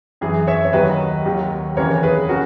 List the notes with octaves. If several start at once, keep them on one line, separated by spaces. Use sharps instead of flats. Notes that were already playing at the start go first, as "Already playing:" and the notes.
F#2 E3 G#4
C#5 E5
C#5
D#2 D#3 F#3 B4 D#5
D#2 D#3 F#3
D#2 C#3 E3 A#4 C#5
G#4 B4
C#3 F#4 A#4